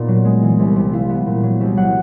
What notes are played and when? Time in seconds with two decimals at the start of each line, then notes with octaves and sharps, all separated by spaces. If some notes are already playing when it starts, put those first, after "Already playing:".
Already playing: A#2 B3 D#4 D5
0.08 F#3
0.25 G#3
0.42 E3
0.59 C2
0.76 C3
0.93 E4 F5
1.09 B3
1.26 A#2
1.43 F#3
1.60 C2 E5
1.77 F#3 F#5